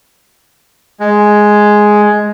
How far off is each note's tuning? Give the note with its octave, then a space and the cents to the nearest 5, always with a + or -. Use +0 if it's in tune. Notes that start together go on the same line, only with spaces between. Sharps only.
G#3 +5